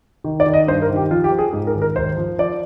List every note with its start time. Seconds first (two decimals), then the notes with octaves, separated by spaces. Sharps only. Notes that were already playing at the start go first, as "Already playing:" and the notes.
0.24 D#3
0.40 D5
0.46 D#3
0.54 D#5
0.67 G2 C5
0.82 A#4
0.90 D#3
0.96 G4
1.11 F3 F4
1.24 G4
1.31 F3
1.38 G#4
1.53 G#2 G#4
1.67 A#4
1.74 G#1
1.82 A#4
1.96 D#2 C5
2.17 F3
2.38 F3 D5